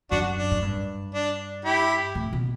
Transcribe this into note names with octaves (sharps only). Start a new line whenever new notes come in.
F#2 D4 F#4
D4
A2
G2
D4
E4 G4
A2
B2